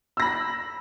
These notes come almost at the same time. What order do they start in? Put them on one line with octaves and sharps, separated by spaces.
E6 A#6 B5